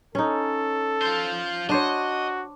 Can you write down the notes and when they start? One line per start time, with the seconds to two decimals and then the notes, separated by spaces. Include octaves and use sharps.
0.15 C#4 D#4 A4
1.02 F4 C5
1.69 D4 F#4 C5 C#5 D#5